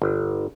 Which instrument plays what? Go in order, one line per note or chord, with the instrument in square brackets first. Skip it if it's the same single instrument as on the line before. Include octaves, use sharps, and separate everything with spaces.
[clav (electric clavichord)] G1